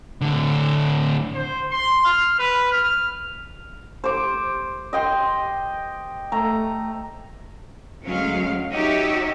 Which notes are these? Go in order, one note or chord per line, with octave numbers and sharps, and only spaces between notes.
A2 D3
C5
C6
F6
B4
F6
C5 D6
D#5 G5 C6
A3 A#5
D2 F#3 G#3 C#4 F5
D#4 F#4 G4 C#5 D#5 E5